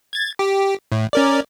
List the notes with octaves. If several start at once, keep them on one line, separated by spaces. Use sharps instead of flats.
G#6 A6
G4
A2
C#4 A#4 D5